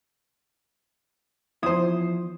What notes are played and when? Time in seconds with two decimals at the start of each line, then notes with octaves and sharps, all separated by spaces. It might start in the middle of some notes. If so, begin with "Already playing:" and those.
1.63 E2 F3 E4 C5 D#6